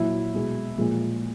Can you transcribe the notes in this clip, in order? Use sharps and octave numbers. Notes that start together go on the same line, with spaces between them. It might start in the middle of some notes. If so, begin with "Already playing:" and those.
Already playing: A#2 F#3 E4
B2 G#3
A#2 F3 G#3